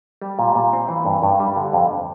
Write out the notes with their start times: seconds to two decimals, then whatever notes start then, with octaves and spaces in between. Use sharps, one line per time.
0.22 G3
0.39 A#2
0.55 A#2
0.73 C4
0.89 E3
1.05 G2
1.22 G2
1.40 G3
1.56 D3
1.73 F2